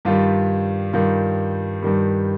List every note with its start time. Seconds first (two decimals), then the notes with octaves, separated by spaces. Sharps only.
0.05 G2 D#3 G3 F4
0.93 G2 D#3 G3 F4
1.83 G2 D#3 G3